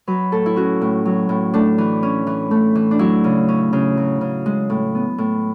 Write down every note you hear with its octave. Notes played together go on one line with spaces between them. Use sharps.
F#3 B4
A2 A4
E4
C#4 F#4
A2
F#3
A2
A3 D4
E3
C#4
E3
A3
E3
D4
F#3 E4
C#3
C#4
C#3
F#3
C#3
G#3
A2
B3
A2